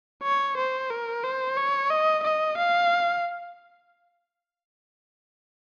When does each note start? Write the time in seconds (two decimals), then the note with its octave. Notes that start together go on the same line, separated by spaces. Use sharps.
0.23 C#5
0.58 C5
0.90 A#4
1.24 C5
1.57 C#5
1.90 D#5
2.24 D#5
2.58 F5